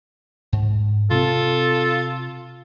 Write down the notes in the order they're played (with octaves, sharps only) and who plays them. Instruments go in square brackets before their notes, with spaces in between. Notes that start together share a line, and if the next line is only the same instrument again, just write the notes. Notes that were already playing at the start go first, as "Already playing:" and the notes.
[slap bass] G#2
[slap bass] C3 C4 [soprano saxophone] F4 [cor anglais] A4